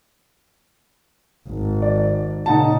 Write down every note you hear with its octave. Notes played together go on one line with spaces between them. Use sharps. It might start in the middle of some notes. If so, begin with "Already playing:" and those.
G#1
D5
A#2 C#3 D#4 F#5 A5